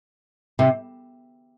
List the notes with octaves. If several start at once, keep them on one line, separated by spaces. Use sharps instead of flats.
C3